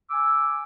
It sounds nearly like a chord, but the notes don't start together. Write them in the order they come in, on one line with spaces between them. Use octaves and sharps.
E6 D6 G#5